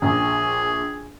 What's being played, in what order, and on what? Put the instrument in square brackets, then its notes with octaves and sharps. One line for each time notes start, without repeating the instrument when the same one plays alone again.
[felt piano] A#1 [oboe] G#4